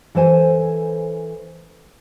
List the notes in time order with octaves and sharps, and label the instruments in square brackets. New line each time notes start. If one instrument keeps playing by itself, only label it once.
[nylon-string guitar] E3 A4 C5 G#5